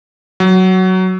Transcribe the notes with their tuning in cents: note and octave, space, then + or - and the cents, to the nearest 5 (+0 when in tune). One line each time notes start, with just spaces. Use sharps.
F#3 +10